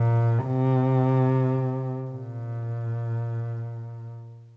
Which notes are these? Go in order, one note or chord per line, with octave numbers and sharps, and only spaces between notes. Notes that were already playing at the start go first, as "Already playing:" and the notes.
Already playing: A#2
C3
A#2